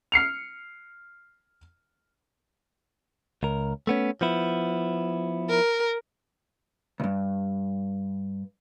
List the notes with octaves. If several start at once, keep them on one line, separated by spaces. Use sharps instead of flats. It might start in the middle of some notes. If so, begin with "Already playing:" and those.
F6 C7 C#7 F7
C#2 A#4
A3 B3 C#4
F3 B3 E4
A#4
C#2 G2